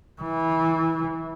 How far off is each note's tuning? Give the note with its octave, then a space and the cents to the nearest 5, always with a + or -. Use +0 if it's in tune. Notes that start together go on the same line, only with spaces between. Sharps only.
E3 -20